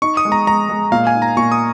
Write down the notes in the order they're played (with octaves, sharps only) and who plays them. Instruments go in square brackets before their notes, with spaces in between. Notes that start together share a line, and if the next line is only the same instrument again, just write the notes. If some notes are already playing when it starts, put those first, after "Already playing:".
[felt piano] D#4 [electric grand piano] C#6
[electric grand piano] D#6
[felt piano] G#3
[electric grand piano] A#5
[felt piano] G#3 [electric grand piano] A#5
[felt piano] G#3
[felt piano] A#2 [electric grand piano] F5
[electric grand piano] G#5
[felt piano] D#4
[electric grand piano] A#5
[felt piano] A#2 [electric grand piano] C#6
[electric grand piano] D#6